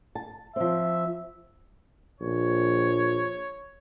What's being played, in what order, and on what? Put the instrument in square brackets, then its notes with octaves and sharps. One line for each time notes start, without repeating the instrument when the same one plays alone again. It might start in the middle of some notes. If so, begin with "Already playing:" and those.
[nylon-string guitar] A5
[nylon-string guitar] F3 C4 [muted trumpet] E5
[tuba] A#1 [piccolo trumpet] C#5